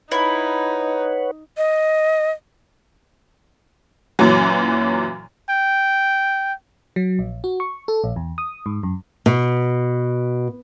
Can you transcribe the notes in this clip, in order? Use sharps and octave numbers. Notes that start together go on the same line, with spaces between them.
D#4 E4 B4 C#5 F#5
D#5
F#2 A#2 E3 F#3
G5
F#3
A#1
F#4
C#6
A4
A#1
E2
D#6
G#2
F#2
B2